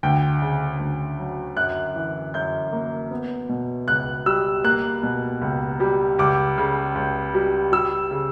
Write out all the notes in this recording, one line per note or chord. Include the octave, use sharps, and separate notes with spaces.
D2 G5
C#3
D2
F#3
F#2 F#6
E3
F#2 G6
A#3
B3
B2
C#2 F#6
G3 E6
A#3 F#6
B2
C#2
G3
C#2 D6
C#3
C#2
G3
G3 E6
C#3